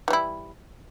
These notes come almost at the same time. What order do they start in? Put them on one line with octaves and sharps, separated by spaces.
E3 G3 E4